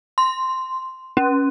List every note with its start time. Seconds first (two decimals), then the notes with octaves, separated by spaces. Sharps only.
0.18 C6
1.17 C#4